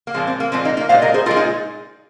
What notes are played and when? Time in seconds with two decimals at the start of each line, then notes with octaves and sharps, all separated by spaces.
0.07 A#3
0.14 A#2 F3 G#3 C4
0.27 C4
0.40 A#3
0.52 A#2 F3 G#3 C4
0.65 A#3 D#4
0.77 A#3 D#4
0.89 A#2 G#3 C5 F5
1.02 A#4 D#5
1.14 G#4 C5
1.26 A#2 G#3 F4 A#4
1.36 D#4 G#4